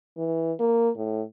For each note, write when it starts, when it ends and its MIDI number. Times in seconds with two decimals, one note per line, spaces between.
0.17 0.53 52
0.59 0.89 58
0.96 1.22 45